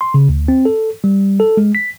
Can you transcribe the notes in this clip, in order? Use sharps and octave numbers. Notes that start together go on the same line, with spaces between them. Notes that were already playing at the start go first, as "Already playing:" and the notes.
C6
C#3
D2
C4
A4
G3
A4
G#3
B6